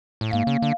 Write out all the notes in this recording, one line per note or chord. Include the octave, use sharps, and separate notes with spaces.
A2
G#2 A#3
C#3
D3